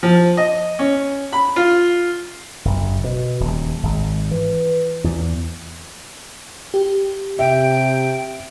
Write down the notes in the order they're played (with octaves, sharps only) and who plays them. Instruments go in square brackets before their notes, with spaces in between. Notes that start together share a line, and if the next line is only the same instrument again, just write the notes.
[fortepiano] F3
D#5
C#4
B5
F4
[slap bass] F#1
B2
D#1
G#1
E3
E2
[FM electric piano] G4
[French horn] C3 [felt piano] E5 [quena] G5